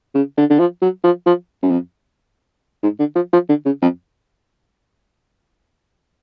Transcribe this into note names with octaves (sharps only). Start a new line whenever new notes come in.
C#3
D3
D3
F3
F#3
F3
F3
F#2
F2
G#2
D3
F3
F3
D3
C#3
F2